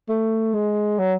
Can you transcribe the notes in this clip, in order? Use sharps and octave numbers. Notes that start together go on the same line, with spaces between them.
A3
G#3
F#3